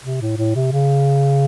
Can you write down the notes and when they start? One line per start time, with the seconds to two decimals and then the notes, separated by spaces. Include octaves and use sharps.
0.04 C3
0.21 A2
0.38 A2
0.55 C3
0.72 C#3